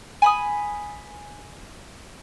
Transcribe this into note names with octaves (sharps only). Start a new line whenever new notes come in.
G#5 B5 D#6